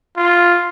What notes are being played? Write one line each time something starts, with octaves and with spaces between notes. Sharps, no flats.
F4